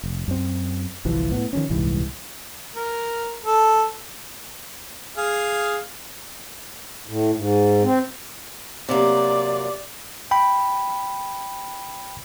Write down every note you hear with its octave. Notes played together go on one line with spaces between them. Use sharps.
F1
F#2 C4
G1 C2 E3 F3
A2 B3
D#3 F3 C#4
D#1 C2 G#2 E3
A#4
A4
G#4 F5
A2
G#2
C4
C3 F#3 A#3 D5
G5 B5